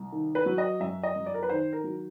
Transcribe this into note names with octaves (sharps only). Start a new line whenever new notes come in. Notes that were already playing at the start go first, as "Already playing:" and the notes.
Already playing: C2
D#3
B4
F#3
D#5
F#2 E5
D#5
F#2
D5
A#4
B4
D#3 C5
A#4
F#3